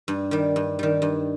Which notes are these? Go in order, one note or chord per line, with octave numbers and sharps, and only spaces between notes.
G2
D#3 G3
G2
D#3 G3
G2